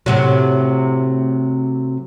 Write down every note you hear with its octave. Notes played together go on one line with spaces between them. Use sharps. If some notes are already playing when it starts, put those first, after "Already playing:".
A2 C3 F#3